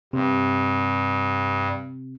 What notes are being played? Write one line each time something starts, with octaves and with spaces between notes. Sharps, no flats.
G2 C3